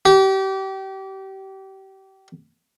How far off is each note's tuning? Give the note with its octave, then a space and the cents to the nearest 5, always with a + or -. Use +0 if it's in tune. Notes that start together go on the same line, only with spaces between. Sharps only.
G4 -30